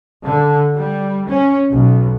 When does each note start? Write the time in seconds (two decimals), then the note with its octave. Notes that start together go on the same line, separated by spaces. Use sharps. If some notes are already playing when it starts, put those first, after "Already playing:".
0.24 D3
0.76 G3
1.27 C#4
1.71 B1